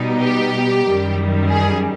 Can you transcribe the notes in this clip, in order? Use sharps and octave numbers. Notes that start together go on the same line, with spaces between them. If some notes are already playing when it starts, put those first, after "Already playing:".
Already playing: B2 G3 B3 D#4
G4
F#2 D#3 G3
G#4